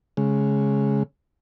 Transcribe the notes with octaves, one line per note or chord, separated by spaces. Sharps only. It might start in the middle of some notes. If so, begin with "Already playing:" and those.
C#3 G#3